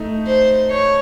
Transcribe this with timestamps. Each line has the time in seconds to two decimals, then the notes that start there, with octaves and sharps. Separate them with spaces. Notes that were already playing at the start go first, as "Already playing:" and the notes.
Already playing: A3 D#4
0.27 C5
0.70 C#5